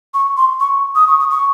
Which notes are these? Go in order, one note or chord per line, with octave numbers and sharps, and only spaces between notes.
C#6
C6
C#6
D#6
C#6
D#6
C#6